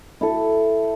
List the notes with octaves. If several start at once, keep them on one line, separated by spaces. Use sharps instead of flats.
E4 A4